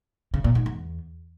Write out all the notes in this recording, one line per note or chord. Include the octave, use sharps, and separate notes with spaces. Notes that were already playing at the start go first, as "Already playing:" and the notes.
C#3
A#2
G#2
E2